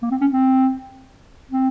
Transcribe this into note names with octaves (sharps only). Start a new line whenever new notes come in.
A#3
C4
C#4
C4
C4